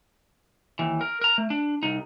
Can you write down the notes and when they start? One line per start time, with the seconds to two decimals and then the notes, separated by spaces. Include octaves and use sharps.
0.79 D#2 E3
1.01 A#4
1.21 A#4 A#5
1.38 A3
1.50 D4
1.83 C2 D#4